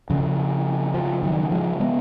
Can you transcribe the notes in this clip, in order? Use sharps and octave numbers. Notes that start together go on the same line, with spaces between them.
F2 C#3
F3
D#3 F#3
F3 G#3
G#3 B3